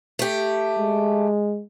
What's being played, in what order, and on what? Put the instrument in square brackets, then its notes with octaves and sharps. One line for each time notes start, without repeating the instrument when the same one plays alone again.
[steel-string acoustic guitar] A3 G4
[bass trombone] G#3